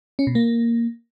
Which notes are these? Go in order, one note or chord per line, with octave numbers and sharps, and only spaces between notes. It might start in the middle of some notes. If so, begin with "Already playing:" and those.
C#4
B2
A#3